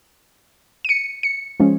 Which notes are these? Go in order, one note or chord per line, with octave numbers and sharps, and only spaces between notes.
D#7
C#7
C#7
F3 G#3 C#4